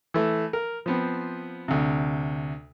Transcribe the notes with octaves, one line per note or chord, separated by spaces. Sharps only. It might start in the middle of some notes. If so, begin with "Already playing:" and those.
E3 A3
A#4
F3 B3 C4
D2 C3